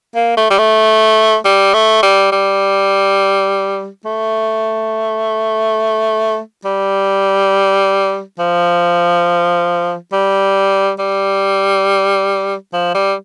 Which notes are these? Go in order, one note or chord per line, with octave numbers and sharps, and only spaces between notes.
A#3
A3
G3
A3
G3
A3
G3
G3
A3
G3
F3
G3
G3
F3
G3